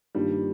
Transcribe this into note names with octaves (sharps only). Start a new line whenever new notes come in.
G2 D#3 G3 A#3 F4